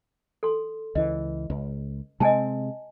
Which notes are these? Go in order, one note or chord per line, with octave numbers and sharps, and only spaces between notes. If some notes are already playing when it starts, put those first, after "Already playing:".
A4 C6
C#2 E3 D#5
C#2
C3 G#3 C4 D#5 G#5 A5